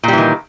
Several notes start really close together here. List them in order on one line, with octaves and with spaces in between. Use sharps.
A#2 G3 E3 D#3